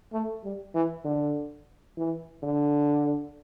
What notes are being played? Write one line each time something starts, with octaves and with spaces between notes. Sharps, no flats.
A3
G3
E3
D3
E3
D3